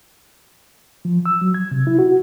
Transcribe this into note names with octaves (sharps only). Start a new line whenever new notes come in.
F3
E6
F#3
G#6
C3
E4
F#4